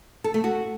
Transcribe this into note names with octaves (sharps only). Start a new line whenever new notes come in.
A4
A3
F#4